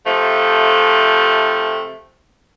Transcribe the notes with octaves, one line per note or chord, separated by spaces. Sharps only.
C3 F3 A3